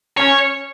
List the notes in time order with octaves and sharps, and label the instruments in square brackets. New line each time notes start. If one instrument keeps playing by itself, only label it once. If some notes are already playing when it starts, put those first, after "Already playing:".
[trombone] C#4 [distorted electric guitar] C#5